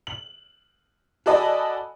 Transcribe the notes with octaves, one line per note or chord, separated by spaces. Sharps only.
F#7
F#4 A4 D5 D#5 G#5 B5